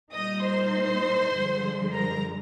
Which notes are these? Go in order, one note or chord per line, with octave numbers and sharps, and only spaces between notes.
A#2 G3 A#3 D#4 D#5 D#6
C5 C6
G2 D3 F3 G#3
A#4 A#5